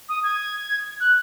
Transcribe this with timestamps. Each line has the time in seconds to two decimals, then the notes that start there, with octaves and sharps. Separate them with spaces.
0.09 D#6
0.23 G#6
1.00 F#6